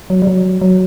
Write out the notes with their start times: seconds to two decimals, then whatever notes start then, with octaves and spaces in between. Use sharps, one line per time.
0.10 F#3
0.22 G3
0.27 F#3
0.62 F#3